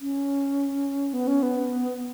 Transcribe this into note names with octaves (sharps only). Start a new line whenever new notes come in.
C#4
B3
C#4
B3